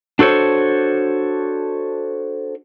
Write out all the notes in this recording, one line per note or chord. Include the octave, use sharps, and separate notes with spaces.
D4 F#4 A4 C5 C#5